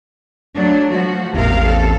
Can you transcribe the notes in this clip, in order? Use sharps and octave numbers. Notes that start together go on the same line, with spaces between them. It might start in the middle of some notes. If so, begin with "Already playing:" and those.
F#3 A3 D4
F3 F#4
A1 E2 C3 A#4 F5
A4